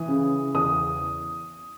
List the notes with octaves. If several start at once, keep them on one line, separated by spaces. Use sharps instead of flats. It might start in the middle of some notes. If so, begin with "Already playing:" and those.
Already playing: E3 D#6
C#3
E2 D#6